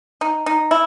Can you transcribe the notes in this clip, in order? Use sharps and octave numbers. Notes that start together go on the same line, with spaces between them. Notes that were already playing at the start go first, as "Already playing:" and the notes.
D#4
D#4
E4